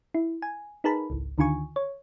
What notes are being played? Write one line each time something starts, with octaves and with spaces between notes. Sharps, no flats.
E4
G#5
D#4 G#4 A#4 B4 A5 B5
G#1 C#2
D2 D3 D#3 F4 G#5 C#6
C#5